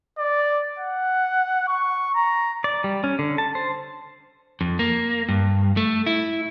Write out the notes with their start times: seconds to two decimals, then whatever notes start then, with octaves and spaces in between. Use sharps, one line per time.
0.18 D5
0.79 F#5
1.68 C#6
2.15 A#5
2.64 D5
2.84 G3
3.04 C#4
3.19 D3
3.38 A5
3.55 C5
4.61 F2
4.79 A#3
5.29 G2
5.77 A3
6.06 E4